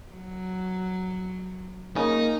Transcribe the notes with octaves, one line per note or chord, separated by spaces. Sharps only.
F#3
C#3 A#3 D#4